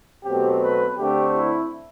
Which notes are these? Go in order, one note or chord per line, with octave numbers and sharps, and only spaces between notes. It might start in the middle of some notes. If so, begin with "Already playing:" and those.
B2 F#3 A3 C4 G4
B4
D3 A3 C4 G4
E4